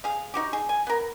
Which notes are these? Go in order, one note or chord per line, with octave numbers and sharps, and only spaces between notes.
G#4 F5
D#4 F#4 G4
G#4
G#5
B3 A#4